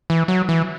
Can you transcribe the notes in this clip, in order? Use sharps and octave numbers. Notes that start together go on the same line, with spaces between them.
E3
F#3
E3